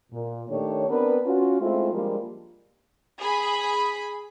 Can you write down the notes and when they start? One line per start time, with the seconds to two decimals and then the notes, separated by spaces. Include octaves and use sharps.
0.13 A#2
0.49 D#3 A3 D4 G4 C#5
0.89 B3 C4 D4 A#4 B4
1.26 C#4 F4 F#4
1.61 G#3 A3 C4 E4 F4
1.93 F3 G3 G#3 A#3 D4 F4
3.18 G#4 B5